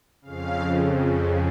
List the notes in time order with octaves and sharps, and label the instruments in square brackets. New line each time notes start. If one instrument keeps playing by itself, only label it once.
[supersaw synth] F2 C#3 F5